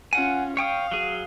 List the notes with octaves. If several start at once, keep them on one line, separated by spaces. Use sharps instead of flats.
C#4 F4 F#5 G#5
C#5 F5 G5 D#6
F#3 G#4